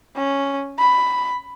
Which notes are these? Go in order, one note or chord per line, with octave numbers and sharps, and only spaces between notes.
C#4
B5